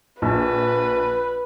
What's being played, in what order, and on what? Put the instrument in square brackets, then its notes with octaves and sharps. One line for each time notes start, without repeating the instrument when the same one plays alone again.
[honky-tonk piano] A#1 [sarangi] B4